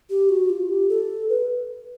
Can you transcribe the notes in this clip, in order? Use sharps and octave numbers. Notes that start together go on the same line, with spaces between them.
G4
F#4
F4
G4
A4
B4